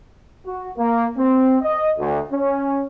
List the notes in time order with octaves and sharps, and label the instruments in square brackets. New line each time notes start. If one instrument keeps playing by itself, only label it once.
[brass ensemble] F#4
A#3
C4
D#5
D2
C#4